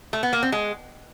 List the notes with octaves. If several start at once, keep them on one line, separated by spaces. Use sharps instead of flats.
A3
B3
A#3
C4
G#3